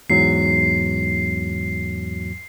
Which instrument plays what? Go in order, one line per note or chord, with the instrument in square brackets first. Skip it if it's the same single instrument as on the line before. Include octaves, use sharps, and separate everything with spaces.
[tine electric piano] E2 G#2 F#3 [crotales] C7